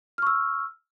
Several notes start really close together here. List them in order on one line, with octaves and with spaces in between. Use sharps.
F6 C#6 E6